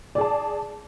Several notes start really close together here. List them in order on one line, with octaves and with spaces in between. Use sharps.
D5 G#4 A5